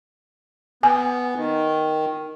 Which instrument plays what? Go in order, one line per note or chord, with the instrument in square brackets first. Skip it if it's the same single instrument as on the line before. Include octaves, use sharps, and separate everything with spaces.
[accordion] B3 [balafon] G#5
[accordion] D#3